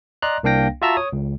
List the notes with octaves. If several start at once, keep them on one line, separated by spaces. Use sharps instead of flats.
D5 D#5 A#5 C6 F#6
C2 A#3 D4 F5 G5 A#6
F4 F#4 E5 A5 A#5 E6
C#5 D#6
C#2